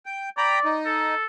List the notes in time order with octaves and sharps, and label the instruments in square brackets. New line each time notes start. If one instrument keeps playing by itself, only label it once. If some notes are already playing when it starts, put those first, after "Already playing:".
[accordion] G5
[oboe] D5 [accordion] G5 A#5 B5
[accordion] D#4
[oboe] A4